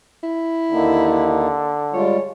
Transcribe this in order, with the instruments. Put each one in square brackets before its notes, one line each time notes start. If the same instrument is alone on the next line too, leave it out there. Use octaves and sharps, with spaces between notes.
[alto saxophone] E4
[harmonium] D#2 A#3 D#4 [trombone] D3
[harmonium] G3 G#3 F4 [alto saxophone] C#5